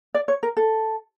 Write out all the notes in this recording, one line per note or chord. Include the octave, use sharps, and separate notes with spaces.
D5
C#5
A#4
A4